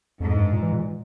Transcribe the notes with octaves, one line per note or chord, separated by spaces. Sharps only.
F2 G#2
G2
A#2
E3
A#2